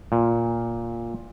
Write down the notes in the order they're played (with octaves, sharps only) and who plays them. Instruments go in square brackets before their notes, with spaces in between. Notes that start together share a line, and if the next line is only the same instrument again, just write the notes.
[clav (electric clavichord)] A#2